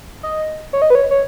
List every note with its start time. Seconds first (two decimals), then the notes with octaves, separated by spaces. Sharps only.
0.23 D#5
0.73 C#5
0.82 D#5
0.90 B4
0.95 C#5
1.11 C#5